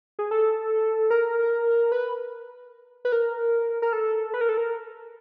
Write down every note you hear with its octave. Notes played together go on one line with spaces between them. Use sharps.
G#4
A4
A#4
B4
B4
A#4
A#4
A4
B4
A#4
A4
A#4